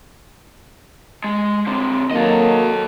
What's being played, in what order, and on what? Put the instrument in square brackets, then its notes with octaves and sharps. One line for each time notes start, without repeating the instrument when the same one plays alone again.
[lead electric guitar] G#3
D3 C4
[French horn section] D#3 F#3 A#3 [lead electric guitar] A4 D#5